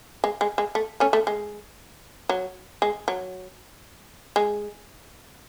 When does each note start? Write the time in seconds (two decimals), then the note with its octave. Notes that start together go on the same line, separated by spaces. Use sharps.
0.24 G#3
0.41 G#3
0.58 G#3
0.75 A3
1.00 A3 C#4
1.13 A3
1.27 G#3
2.29 F#3
2.82 G#3
3.08 F#3
4.36 G#3